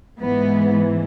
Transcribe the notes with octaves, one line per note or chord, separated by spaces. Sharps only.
G#2 E3 B3